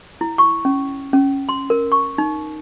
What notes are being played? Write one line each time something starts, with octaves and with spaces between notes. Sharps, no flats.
E4
C#6
C#4
C#4
C6
A#4
C#6
D#4